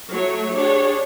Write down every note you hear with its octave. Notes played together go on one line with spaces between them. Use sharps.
F#3 A3 C#5
D4 G4 G#4 C#5